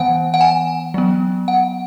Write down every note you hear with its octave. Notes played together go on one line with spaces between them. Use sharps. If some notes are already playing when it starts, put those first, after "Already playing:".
Already playing: E3 B3 F#5
F#5
G#5
F#3 B3
F#5